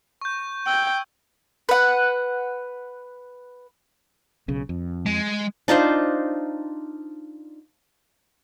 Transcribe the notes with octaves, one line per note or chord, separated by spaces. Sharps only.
C#6 G6
G5 E6 G#6
B4 F#5
B1 C#3
F2
G#3
D4 D#4 F4 C5